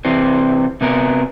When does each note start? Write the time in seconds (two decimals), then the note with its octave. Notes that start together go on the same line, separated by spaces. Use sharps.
0.05 C3 E3 C4
0.81 C3 B3 A#4